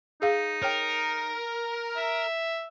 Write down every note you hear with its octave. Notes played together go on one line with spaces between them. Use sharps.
D#4 G#4 F5
A#4 C#5 G5
E5